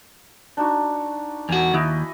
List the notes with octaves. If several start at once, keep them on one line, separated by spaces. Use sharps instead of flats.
D4 D#4 F#4
E2 F#4 G#5
D#2 E4 F#4 D#5